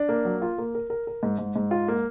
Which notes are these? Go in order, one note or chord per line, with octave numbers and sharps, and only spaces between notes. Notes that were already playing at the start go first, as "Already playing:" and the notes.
Already playing: D4
A#3
F#3
F4
A#3
A#4
A#4
A#4
G#2
G#2
G#2
F4
A#3